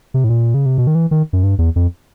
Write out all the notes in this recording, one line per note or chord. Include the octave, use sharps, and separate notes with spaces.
C3
A2
A#2
C#3
C3
B2
D#3
E3
D#3
F#2
G2
E2
F2